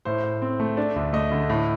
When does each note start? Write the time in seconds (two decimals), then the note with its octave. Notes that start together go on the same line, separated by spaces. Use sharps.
0.05 A2 C5
0.24 A2
0.42 C4
0.60 A3
0.77 D4 D5
0.96 D2
1.13 A3 D#5
1.32 D3
1.50 A2